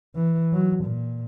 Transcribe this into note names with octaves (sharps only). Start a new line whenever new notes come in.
E3
F#3
A#2